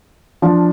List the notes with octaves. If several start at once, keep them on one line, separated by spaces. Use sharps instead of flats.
F3 D4 F4